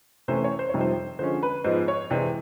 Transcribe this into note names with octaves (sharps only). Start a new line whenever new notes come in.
C3 E3 A3 C#4 C5
C#5
C5
F2 C3 D#3 G3 C#5
C5
D3 F3 G#3 C#4 C5
B4
G#2 F3 G#3 B3 C5
C#5
C3 E3 G#3 C4 D5